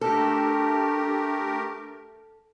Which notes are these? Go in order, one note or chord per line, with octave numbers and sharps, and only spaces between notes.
A3 D4 G4 A4 A#4